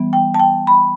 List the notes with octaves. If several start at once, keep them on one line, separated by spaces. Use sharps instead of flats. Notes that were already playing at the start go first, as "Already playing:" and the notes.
Already playing: E3 G3 B3
G5
A5
G5
B5